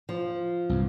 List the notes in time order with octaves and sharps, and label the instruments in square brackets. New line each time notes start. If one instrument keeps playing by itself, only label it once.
[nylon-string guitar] F3
[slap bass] C2 G2